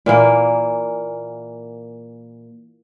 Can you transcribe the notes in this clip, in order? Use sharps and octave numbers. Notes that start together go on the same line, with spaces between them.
A#2 E3 A#3